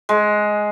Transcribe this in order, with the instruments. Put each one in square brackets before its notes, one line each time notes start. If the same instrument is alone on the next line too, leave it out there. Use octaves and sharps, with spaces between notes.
[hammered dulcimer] G#3